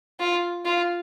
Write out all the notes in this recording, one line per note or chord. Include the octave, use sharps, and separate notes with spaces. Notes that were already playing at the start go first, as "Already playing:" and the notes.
F4
F4